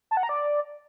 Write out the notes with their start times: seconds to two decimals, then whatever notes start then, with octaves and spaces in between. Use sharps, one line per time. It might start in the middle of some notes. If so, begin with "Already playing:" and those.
0.11 A5
0.17 F#5
0.23 A#5
0.29 D5